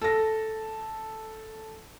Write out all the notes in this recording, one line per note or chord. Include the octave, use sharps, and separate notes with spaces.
A4 A#6